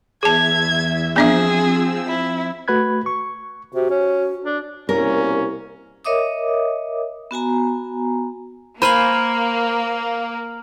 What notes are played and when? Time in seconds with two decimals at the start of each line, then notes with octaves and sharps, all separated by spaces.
0.23 E2 G#4 E5 A5 G#6
1.16 F3 B3 C4 D4 G#4 E5 E6
2.08 E4
2.68 A3 F#4 B4 B5 F#6 G#6
3.06 C#6
3.73 C3 F#4
3.90 C#4
4.44 D4
4.89 C2 B2 A#3 C#4 A#4
6.05 A#4 C#5 D#5 E5 D6 D#6
7.31 B3 F#4 G#5 A#5
8.82 A#3 C5 G#5 A#5 B5 F6 F#7